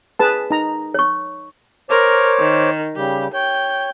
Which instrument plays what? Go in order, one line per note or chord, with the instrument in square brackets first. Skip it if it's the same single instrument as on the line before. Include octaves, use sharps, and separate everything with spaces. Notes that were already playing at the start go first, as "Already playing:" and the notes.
[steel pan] G#4 B4 A5
D#4 A#5
[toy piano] C#5 C#6
[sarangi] A#4 [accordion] C5 C#5 D6
[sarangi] D#3
[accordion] C#3 G3 [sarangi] G4
[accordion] C#5 [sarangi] G5